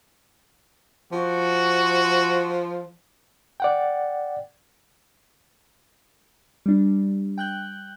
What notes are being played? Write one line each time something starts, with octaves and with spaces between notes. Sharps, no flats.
F3 F#4
D5 F#5 G5
G3 D4
G5 F#6 G6